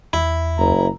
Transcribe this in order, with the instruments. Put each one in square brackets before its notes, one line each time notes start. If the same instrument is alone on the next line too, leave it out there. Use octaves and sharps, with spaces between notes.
[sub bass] E2 [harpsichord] E4
[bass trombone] F#1 [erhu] A#5